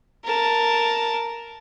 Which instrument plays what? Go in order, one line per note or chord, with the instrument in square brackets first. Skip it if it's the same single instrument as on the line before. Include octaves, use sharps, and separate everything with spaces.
[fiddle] A#4 A5